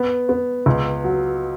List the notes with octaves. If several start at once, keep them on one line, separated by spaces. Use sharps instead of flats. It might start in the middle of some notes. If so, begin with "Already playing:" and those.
Already playing: B3
B3
C#2
F#3